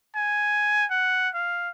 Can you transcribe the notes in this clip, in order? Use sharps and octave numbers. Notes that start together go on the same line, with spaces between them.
G#5
F#5
F5